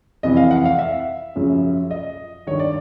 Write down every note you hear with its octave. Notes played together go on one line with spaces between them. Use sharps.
F2 C3 E3 D#5
F5
F#5
F5
E5
F#2 C#3 F3
D#5
G2 D#3 C#5
D5